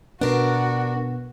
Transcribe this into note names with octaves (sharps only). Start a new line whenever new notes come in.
B2 B3 D4 F#4 A#4